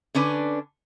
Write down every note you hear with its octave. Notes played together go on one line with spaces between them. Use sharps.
D3 C#4 D4 B4